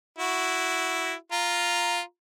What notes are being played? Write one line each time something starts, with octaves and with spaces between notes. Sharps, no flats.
E4 F#4
F4 A#5